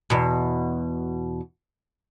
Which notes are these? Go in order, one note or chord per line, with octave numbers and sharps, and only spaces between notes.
E2 B2